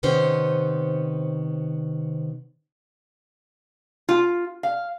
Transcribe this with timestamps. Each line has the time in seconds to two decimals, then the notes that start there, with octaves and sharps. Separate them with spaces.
0.03 C3 D#3 B3 C#4 C5
4.09 F4
4.63 F5